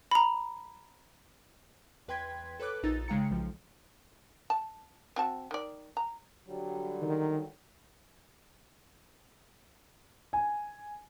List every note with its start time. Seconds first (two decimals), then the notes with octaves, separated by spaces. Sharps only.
0.11 A#5 B5
2.08 E2 B4 G5 C6 G#6 B6
2.60 A4 B4 C#5 D6 F#6
2.83 A#1 D#4 E6 A6
3.08 C#3 G#3 F5 G5 A#5 C#7
3.30 B1 F3
4.50 A5
5.16 C4 F#4 A5
5.51 D#3 D5
5.97 A#5
6.47 D3 F#3 G3
7.02 D#3
10.33 G#5